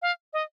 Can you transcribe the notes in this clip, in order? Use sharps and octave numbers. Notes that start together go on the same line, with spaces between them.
F5
D#5